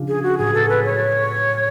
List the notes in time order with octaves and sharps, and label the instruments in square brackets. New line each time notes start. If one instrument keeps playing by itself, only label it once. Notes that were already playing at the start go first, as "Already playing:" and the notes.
Already playing: [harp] C#3 F3 G#3 D4 F4
[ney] G#4
F#4
[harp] A2 F#3 B3 [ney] G#4
[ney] A4
B4
C#5